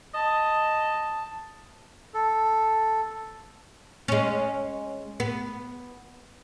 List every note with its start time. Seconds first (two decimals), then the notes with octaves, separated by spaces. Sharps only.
0.14 D#5 A5
2.14 A4
4.08 G#3 C#4
5.20 B3